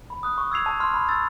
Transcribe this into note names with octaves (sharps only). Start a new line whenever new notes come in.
B5
D#6 F#6
C#6
E6 G#6 C7 F7
A5
C6 F6
B5
E6 A6